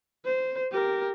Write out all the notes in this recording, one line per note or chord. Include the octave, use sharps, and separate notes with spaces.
C5
G4 A#4